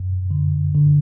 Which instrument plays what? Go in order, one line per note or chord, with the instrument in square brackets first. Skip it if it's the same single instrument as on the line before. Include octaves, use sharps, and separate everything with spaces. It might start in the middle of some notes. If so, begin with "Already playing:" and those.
Already playing: [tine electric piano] F#2
D3
D3